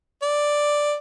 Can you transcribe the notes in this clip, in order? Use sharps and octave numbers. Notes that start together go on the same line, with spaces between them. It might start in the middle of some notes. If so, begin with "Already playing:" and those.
D5